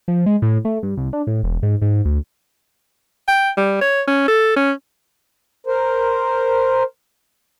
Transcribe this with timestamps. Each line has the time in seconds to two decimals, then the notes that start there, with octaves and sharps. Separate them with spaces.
0.08 F3
0.26 G#3
0.42 A2
0.65 A3
0.83 G2
0.97 C2
1.13 D4
1.27 A2
1.43 E1
1.63 G#2
1.82 G#2
2.05 D2
3.28 G5
3.57 G3
3.81 C#5
4.08 C#4
4.28 A4
4.56 C#4
5.67 A#4 C5